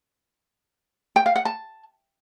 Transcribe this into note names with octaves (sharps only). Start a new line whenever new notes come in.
G5
F5
F#5
A5